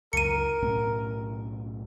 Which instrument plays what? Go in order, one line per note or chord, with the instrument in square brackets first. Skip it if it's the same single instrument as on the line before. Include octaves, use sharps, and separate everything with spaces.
[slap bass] C#2 F#2 [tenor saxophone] A#4 [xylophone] C#7 D#7
[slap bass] B1 A2 C#4